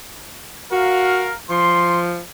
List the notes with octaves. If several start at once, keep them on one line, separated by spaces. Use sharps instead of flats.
F#4 A#4 F5
F3 C6